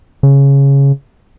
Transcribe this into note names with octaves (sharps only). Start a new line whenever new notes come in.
C#3